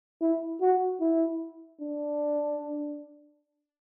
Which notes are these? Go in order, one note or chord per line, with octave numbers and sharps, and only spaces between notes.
E4
F#4
E4
D4